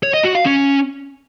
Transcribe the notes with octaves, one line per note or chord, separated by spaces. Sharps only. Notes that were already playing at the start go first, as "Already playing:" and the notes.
C#5
D#5
F#4
F5
C#4